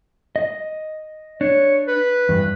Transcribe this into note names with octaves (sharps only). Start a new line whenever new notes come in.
D#5
D4 C#5
B4
E2 G2